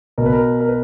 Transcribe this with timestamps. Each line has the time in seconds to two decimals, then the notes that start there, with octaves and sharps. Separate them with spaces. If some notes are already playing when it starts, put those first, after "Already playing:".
0.18 B2 A#4
0.26 B4
0.32 A#4
0.61 A#4
0.69 B4